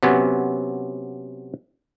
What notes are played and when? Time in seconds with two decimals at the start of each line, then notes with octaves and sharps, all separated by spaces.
0.03 C3 F#3 B3 C#4